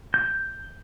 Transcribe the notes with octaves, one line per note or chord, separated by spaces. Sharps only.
G6